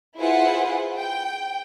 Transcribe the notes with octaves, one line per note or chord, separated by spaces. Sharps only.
E4 F4 G#4 B4 C5 F#5
G5